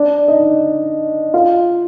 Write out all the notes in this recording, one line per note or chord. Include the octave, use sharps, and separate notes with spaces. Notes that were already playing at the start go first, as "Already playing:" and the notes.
Already playing: D4 D5
D#4 D#5
F4 F5